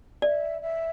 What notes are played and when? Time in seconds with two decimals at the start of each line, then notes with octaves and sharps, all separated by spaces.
0.22 D5 E5
0.62 E5